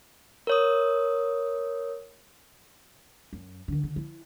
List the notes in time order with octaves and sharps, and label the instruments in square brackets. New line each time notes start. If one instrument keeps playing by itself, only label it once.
[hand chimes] A#4 C#5 D#6
[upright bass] F#2
D3 D#3
D3
F3 E4